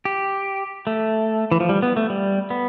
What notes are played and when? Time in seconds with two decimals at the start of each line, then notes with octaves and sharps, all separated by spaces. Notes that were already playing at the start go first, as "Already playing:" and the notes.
0.05 G4
0.87 A3
1.51 E3
1.60 F3
1.69 G3
1.82 B3
1.97 A3
2.10 G3
2.50 B3